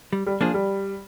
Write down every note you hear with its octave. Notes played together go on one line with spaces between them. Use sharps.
G3
G3
F3 A#3 D4 G#4
G3